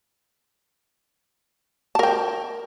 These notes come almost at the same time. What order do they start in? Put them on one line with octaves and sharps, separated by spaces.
A5 A#4 G5